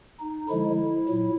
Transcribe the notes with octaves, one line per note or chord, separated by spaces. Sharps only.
D#4
D3 F3 G#3 E4
A#2 F#3